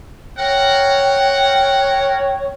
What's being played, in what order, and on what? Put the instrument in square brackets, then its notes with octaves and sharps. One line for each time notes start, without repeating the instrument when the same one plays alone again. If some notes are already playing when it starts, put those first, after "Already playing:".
[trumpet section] A#4 F#5 [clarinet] C#5 [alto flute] G5